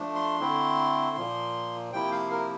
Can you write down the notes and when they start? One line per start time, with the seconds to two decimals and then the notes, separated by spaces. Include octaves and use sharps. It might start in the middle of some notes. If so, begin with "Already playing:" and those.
Already playing: F3 A3 D4
0.15 C6
0.40 D3 A3 C4 E4
1.17 A#2 F3 A#3
1.93 C3 F3 A#3 E4 G5
2.12 F5
2.31 A#4